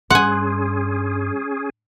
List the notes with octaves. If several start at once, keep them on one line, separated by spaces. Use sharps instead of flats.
G2 C#4 G#4 F#5 G#5 C6